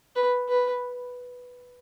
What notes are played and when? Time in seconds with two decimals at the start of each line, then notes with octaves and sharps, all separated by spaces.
0.15 B4
0.49 B4